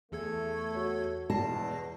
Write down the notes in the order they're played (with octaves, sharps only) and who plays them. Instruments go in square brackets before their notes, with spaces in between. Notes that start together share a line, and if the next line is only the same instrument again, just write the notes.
[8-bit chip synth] E2 A4 G#6 [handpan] E3 G#4 [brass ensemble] A3
[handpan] F#4 C#5
[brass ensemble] E2 [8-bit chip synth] B2 A#6 C7 [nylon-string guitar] A5